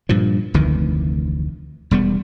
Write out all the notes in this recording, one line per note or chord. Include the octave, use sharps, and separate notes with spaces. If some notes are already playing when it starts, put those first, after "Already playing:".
G2 A#2 F3
F1 D2 D#3 E3
E1 G3 B3